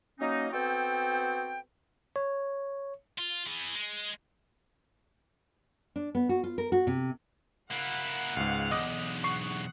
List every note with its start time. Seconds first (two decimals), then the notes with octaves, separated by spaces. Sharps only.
0.20 F#3 A#3 C#4 D#4
0.52 B3 C4 F#4 A4 C5 G5
2.16 C#5
3.18 F4
3.46 E3 G#4
3.75 G#3
5.96 D4
6.15 B3
6.29 F#4
6.44 F4
6.58 A#4
6.72 F#4
6.87 C3
7.71 A#3 E4 F#5
8.37 C#2 G#2 F5
8.71 B1 E2 D#5 D6 D#6
9.24 F#5 C#6 C7